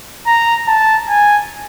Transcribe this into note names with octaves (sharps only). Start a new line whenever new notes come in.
A#5
A5
G#5